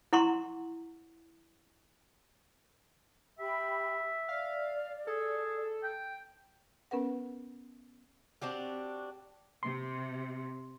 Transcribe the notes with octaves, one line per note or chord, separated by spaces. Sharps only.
E4 F#5 A#5 C6 C#6
G4 E5 G5 B5
D5 F5
G#4 A4
G5
B3 C#4 A#4 B4 F#5
C4 D4 F#4 G4
C3 C6